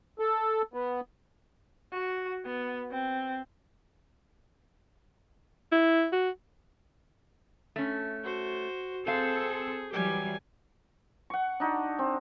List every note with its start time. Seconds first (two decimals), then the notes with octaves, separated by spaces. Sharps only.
0.19 A4
0.74 B3
1.92 F#4
2.46 B3
2.91 C4
5.72 E4
6.13 F#4
7.76 A3 C#4
8.24 F#4 C5
9.07 C4 G#4 A4 C5 F5
9.93 E3 F#3 G3 G4 G#5
11.30 F#5 C#6
11.60 D4 D#4 F#4
11.99 C4